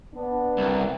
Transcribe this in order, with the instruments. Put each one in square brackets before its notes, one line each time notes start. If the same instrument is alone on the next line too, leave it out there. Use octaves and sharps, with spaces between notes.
[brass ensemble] B3 D4
[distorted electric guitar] C2